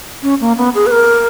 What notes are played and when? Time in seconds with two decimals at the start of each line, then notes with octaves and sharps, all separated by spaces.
0.23 C#4
0.41 A#3
0.57 B3
0.75 G#4
0.86 B4
0.91 A#4